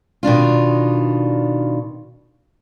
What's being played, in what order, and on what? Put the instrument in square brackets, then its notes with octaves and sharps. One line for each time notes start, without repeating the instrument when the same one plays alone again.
[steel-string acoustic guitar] B2 D#3 D4 F4